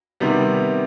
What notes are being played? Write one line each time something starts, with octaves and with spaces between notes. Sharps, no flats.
C3 D#3 G3 B3